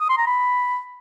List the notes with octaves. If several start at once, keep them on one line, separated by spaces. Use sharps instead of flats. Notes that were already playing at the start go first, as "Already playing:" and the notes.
D#6
C6
A#5
B5